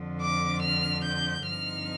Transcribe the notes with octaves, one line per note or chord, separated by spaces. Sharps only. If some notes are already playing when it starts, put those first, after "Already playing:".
Already playing: F2 D3 F3
D6
F6
G6
G2 D3 F3 C4 D#4 F6